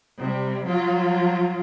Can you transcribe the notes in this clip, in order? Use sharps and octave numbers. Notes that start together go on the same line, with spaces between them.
C3 G3
F#3 F4